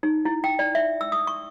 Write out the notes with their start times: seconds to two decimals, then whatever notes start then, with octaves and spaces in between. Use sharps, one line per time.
0.03 D#4
0.25 E4
0.44 G5
0.59 D5
0.75 E5
1.01 E6
1.12 D#6
1.27 C#6